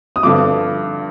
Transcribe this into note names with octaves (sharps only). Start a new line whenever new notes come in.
D#6
G2 D3 F3 D6